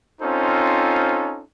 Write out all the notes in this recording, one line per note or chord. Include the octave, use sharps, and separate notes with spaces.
C4 C#4 D#4 F4 A4 C5